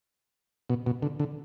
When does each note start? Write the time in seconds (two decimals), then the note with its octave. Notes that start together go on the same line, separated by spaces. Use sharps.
0.70 B2
0.86 B2
1.02 D3
1.20 D3